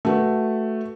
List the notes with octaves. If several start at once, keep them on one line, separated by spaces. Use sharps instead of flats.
A3 F#4 B4